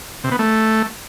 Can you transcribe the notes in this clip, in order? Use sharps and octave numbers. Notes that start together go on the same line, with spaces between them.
C3
B3
A3